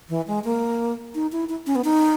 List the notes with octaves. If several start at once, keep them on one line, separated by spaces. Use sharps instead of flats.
E3
G#3
A#3
D#4
E4
E4
C#4
B3
D#4